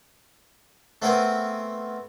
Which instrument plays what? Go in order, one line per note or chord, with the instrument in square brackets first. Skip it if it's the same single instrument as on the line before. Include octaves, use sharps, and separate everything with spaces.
[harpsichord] A3 B3 C4 A#4 G#5